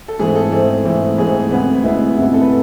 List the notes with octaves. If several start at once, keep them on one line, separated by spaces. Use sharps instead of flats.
A4
G#2 E3 A3 C4 G#4
A4
G#2 E3 A3 C4
G#2 E3 A3 C4
G#2 E3 A3 C4 G#4
D2 C3 G#3 B3
D2 C3 G#3 B3 E4
D2 C3 G#3 B3 E4
A4
B4